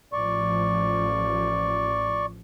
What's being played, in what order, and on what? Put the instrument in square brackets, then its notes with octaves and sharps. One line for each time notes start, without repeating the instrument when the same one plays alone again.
[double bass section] A1 F3 [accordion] D5 C#6